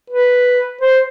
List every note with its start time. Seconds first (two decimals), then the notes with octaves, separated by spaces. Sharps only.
0.10 B4
0.81 C5